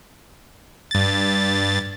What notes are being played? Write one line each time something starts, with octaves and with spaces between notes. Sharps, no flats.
G2 A6